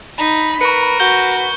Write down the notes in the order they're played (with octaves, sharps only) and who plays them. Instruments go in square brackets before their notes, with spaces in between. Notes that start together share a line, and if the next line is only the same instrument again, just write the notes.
[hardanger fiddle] D#4 [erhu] B5
[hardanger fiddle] A#4 [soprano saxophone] B4 [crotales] C#6 C#7
[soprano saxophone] F#4 [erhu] B4 [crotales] G6 G7